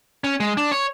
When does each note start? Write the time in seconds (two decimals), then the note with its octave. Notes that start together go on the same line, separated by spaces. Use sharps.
0.24 C#4
0.40 G#3
0.57 D4
0.72 C#5